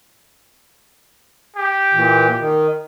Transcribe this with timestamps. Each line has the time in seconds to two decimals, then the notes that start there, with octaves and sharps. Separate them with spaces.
1.57 G4
1.93 A#2 E3
2.38 D#3